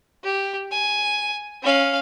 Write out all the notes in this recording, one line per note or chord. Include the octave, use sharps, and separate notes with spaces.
G4
G#5
C#4 F5